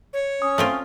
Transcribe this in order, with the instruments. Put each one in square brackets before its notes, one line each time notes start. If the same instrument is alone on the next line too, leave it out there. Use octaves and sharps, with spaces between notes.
[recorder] C#5
[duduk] C#4 [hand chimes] D#6
[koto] A3 C4 F4 [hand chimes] F6